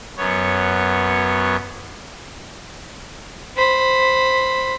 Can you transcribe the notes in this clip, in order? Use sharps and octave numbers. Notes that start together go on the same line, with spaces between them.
F#2 B3 C#5
C5 B5